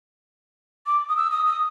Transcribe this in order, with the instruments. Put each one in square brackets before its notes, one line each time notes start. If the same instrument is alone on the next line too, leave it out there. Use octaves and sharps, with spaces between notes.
[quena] D6
D#6
E6
D#6
D#6